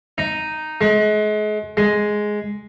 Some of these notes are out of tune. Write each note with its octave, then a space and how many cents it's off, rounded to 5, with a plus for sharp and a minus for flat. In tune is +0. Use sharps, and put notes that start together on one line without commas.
D#4 -5
G#3 +35
G#3 +5